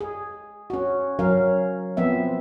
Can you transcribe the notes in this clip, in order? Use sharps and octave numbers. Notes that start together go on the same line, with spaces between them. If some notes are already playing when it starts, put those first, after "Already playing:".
G#4
C#4 F#4
F#3 C#4 A#4 F5
F3 B3 C4 E5